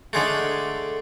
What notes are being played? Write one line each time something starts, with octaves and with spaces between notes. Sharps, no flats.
D3 G#3 A3